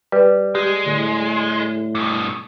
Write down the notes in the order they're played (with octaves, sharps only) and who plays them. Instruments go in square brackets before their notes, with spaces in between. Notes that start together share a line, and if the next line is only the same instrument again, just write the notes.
[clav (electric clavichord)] G3 [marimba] B4
[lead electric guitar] G#3 [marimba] G4
[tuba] A2 [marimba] D3
[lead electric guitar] G2 B2